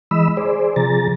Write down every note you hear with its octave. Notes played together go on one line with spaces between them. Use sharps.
E3 G#3 D#5 B5 E6
G#4 C5 D5
C3 F3 G#4 A#5 A6